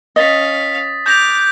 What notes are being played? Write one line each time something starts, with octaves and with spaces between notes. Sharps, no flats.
C#4 D#5 F5 D#6 A6 B6
D6 F#6 G6 A#6 F7